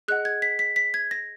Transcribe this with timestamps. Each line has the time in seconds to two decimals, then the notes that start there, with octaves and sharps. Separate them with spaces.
0.08 G#4 D#5 F#5 F#6
0.25 G#6
0.42 B6
0.59 B6
0.76 B6
0.94 G#6
1.11 A#6